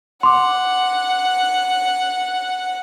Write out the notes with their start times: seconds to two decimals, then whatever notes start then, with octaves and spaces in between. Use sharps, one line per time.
0.23 F#5 C6 D6